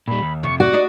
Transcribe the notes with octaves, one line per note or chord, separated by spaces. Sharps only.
A#2 G3 B5
D#2
F2 C3 C#6
F#4 D5 F#5
D4 D#4 D#5